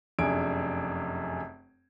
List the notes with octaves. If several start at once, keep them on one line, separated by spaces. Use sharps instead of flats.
F1 F#2 D4 G#4 G#6 D7